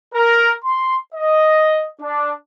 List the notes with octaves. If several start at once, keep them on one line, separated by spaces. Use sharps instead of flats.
A#4
C6
D#5
D4